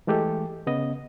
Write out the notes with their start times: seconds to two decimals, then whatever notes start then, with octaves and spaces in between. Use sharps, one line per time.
0.07 E3 G#3 A3 G4 A4
0.67 C#3 B3 D#5